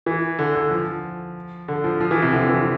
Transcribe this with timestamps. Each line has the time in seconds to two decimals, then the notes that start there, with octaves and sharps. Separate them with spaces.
0.06 E3
0.39 D3
0.55 D3
0.71 F3
1.68 D3
1.84 F3
2.01 F3
2.11 E3
2.22 C3
2.33 D3
2.49 E3